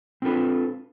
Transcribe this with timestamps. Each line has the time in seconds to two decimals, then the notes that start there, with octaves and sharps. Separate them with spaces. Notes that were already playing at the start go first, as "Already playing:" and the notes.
0.22 C4 D4 F4 A4 B4